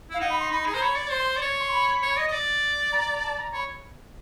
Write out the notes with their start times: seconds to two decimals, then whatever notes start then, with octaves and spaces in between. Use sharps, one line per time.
0.10 E4 F5
0.20 D#4 F#5
0.30 B5
0.40 C6
0.50 D#4 B5
0.61 B5
0.66 G#4
0.71 A#5
0.74 C5
0.80 C#5 B5
0.96 D5
1.11 C5 C6
1.37 D5
1.41 C#5
1.60 C6
1.71 B5
2.02 C#5
2.17 D#5
2.28 D#5
2.32 D5
2.92 A#5
3.13 A#5
3.23 A5
3.38 A#5
3.53 C#5 B5